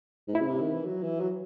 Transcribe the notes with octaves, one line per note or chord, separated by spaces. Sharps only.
G#2
A2 E4
C#3
C3
D#3
E3
F#3
E3
F#3